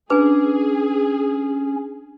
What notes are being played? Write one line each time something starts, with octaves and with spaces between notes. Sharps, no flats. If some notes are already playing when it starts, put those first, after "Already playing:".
C#4 D4 G#4 B4 G#5